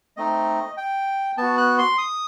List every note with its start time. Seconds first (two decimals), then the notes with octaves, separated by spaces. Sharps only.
0.17 A3 C4 D#4 D#5
0.77 G5
1.37 B3 F#4 A5
1.57 F#6
1.78 C6
1.98 D#6